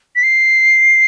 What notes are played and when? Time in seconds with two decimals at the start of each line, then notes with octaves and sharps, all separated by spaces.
0.16 B6
0.23 C7